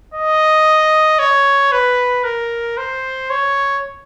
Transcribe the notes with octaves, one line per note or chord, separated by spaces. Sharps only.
D#5
C#5
B4
A#4
C5
C#5